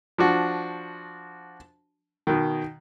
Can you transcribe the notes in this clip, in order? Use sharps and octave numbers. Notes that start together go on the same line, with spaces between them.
F3 D4 F#4
B2 D#3